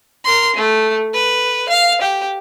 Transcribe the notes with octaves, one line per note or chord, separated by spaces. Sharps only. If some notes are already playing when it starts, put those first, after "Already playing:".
A#4 C6
A3
B4
F5
G4